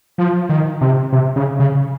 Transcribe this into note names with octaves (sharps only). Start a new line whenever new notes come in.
F3
D#3
C3
C3
C#3
C#3